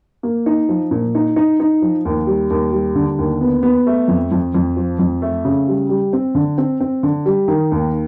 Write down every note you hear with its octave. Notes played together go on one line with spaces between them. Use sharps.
A#3
D#4
F3
A#2
D#4
D#4
D#4
F3
D#2
G3
D#2
G3
D3
D#2
B3
B3
A3
F2
F2
F2
F3
F2
A3
C#3
G3
G3
C4
D3
C4
C4
D3
G3
D#3
D#2